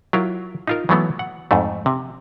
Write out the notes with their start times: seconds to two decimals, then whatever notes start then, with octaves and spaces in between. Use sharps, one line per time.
0.13 F#3 E4 F4 A#4
0.67 D#4 F4 A#4
0.89 E3 F#3 A3 B3
1.19 F#5
1.51 F2 G#2 A3
1.86 C3